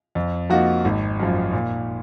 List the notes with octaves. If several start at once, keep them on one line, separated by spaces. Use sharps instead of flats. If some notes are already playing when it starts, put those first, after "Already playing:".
F2
F3 A#3 D#4 F#4
G#1
F#2 F3
A#2